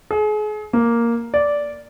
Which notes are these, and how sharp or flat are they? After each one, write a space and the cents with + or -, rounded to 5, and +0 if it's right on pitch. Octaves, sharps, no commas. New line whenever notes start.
G#4 +35
A#3 +0
D5 -10